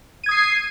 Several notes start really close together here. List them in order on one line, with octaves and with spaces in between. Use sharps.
D#7 G#6 D#6 C7